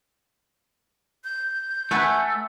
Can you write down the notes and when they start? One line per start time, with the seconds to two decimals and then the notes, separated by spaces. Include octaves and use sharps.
1.24 G6
1.91 A3 B4 F#5 G#5